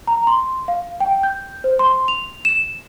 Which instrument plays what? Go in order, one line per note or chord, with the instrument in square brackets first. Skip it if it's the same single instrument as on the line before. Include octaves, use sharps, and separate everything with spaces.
[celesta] A#5
C6
F5
G5
G6
C5
C6
F7
E7